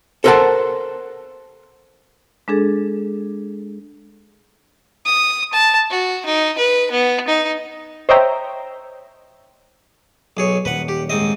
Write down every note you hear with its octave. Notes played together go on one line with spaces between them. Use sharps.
A4 A#4 C5 E5 F#5 A5
G#3 D4 G#4 A4
D#6
A5
F#4
D#4
B4
B3
D#4
C5 C#5 D#5 E5 G5 A#5
B1 G#4 C#5
D#1 B4 F#5
G4
G#2 C4 D#5